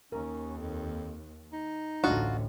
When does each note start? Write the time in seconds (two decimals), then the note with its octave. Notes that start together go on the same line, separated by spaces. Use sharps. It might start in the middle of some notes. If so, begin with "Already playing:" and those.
0.12 D#2 C#4 A#4
0.58 F2
1.53 D#4
2.04 A1 D2 A2 D4 F4 F#4 D#5